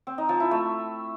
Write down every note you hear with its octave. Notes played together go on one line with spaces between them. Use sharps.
C4
D#4
F3
E4
A3